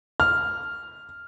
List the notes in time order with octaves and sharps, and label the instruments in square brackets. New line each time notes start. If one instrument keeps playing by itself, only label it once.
[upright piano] F6